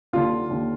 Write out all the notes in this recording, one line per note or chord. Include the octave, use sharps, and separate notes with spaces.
D#2 D3 F4
D#2 D3